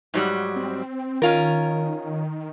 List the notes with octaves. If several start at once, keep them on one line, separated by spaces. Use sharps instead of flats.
G#2 F#3 G3
C4
D#3 C#4 F4 A#4